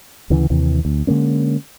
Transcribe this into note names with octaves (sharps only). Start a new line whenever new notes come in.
D2 C#3 E3
D#2 C3 E3
D2
D3 G#3 A#3 C#4